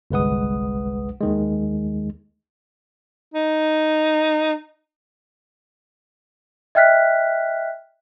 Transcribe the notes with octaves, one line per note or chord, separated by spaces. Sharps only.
G1 C2 G#3 B4 F#5 D#6
D#2 D#3 G#3
D#4
D#5 E5 G5 F6 F#6 B6